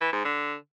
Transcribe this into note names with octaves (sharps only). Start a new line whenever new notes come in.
E3
G#2
D3